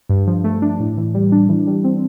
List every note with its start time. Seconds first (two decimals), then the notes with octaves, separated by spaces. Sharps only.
0.09 G2
0.27 F3
0.44 A3
0.62 D4
0.80 A2
0.97 E3
1.14 G3
1.32 D4
1.49 E3
1.67 G3
1.84 C4